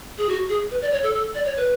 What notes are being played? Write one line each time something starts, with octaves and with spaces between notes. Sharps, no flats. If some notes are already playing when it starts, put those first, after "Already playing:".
G#4
F#4
G#4
B4
D5
C#5
A4
A4
D5
C#5
B4